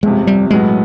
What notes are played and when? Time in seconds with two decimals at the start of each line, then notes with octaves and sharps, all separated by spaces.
0.03 G1 F2 C3 G#3
0.27 G3
0.51 B1 A2 F#3 G#3 B3